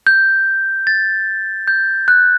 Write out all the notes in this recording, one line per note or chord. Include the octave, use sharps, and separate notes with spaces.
G6
A6
G6
F#6